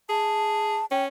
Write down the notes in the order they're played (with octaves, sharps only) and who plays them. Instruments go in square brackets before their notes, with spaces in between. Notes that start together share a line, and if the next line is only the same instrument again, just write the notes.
[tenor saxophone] G#4 [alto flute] A5
[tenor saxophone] C#4 [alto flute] G5